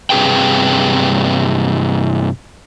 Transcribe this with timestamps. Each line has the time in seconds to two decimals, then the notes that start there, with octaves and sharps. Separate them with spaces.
0.10 G2 C3 G#4 B4 G5